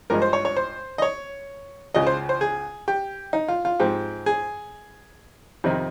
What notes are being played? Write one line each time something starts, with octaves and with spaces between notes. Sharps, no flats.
G2 F3 G#3 A#4
C5
C#5
C#5
C5
D#5
C#5
C#2 C#3 F3 D#5
C5
C5
G#4
G4
D#4
F4
F4
G#2 F3 C4 G4
G#4
F2 C3 D#3